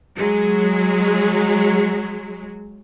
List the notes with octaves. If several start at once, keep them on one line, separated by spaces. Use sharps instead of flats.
F#3 G#3